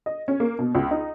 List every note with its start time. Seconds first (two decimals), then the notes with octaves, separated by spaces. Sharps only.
0.06 D#5
0.28 C#4
0.40 A#3
0.59 B2
0.75 C#2
0.91 D#4